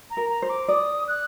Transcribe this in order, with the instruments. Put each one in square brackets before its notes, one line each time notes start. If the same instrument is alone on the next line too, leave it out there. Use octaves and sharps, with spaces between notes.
[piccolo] A#5
[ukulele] A#4
[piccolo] A#5
[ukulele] C5
[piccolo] D6
[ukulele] D5 [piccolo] D#6
[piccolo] F#6